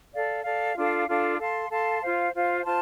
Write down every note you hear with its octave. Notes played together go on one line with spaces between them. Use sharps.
A4 D5 F5
A4 D5 F5
D4 F4 A4 F5
D4 F4 A4 F5
A4 F5 A5 C6
A4 F5 A5 C6
F4 C5 F5
F4 C5 F5
F4 C5 A5 C6